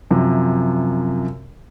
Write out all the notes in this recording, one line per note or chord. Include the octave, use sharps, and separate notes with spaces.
F#2 C3 F3